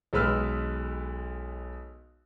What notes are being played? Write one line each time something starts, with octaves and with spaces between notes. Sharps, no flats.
B1 G#3 B4 E6 F6